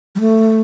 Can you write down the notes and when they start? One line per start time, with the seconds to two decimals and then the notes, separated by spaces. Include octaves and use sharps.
0.15 G3
0.20 A3